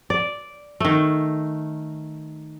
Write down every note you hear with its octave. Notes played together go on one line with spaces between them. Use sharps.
D5
D#3 A3